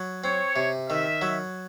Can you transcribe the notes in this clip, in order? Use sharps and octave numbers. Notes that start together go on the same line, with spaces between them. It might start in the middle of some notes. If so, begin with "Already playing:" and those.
Already playing: F#3
C4 C#5
C3
D#3 E5
F#3